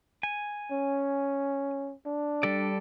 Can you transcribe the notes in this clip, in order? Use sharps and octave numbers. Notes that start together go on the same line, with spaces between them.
G#5
C#4
D4
G3 A4 D5